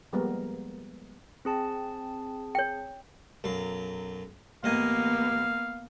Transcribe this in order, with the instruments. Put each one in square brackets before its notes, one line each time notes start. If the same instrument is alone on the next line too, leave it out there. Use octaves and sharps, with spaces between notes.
[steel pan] F3 G3 G#3 A#3 B3 A#4
[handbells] C4 G#4 A5
[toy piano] C#5 G5
[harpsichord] B1 F#2 F5
[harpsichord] A1 D#5 G#5 [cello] A#3 B3 [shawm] F5